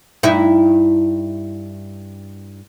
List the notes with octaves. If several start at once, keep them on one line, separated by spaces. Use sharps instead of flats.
G2 D#4 E4